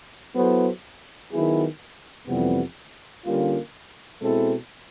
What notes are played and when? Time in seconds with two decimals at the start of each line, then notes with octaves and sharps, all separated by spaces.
0.35 F#3 B3 E4 A4 C5
1.31 D#3 F#3 B3 E4 G#4
2.27 F2 C3 E3 G3 B3
3.24 D3 G3 A#3 C#4 F4
4.21 B2 G#3 C4 E4 A4